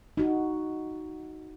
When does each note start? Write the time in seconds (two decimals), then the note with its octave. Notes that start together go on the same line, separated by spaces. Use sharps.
0.17 D#4 F#4